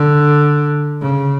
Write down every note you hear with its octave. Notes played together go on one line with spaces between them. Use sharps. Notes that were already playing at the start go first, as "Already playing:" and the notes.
Already playing: D3
C#3